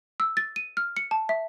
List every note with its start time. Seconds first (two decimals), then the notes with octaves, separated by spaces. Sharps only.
0.20 E6
0.37 A6
0.56 D#7
0.77 F6
0.97 C#7
1.11 A5
1.29 E5